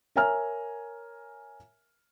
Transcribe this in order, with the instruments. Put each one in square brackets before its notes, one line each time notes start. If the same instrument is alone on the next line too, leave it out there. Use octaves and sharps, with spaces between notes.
[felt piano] A#4 C#5 E5 G#5 A#5 F6